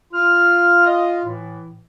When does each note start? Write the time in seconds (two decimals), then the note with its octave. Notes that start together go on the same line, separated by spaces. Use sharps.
0.13 F4 F6
0.86 D#5
1.24 A2 E3